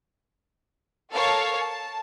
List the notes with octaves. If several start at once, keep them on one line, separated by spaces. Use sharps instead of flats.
A4 A#4 C#5 F5 A5
A5